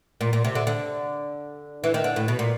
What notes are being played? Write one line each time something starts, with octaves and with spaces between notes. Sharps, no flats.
A#2
A#2
C3
D3
D3
E3
D#3
D3
A2
B2
A#2